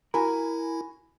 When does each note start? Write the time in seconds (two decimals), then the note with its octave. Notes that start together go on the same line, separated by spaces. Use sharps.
0.14 E4 F#4 A#4 G#5 B5